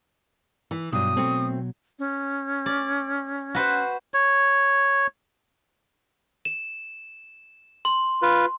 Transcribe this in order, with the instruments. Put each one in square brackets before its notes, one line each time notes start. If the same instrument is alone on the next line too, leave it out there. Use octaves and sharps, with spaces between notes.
[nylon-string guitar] E3
[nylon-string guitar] G2 [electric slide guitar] B2 F#3 [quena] D#6
[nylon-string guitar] A3 C4
[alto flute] C#4
[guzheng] D5
F#4 B4 C5
[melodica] C#5
[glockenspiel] E7
C6
[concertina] F4 B4